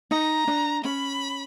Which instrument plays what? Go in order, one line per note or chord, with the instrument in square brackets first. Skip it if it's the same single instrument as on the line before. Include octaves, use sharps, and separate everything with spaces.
[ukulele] D#4 [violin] A#5
[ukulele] D4
[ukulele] C#4 [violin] B5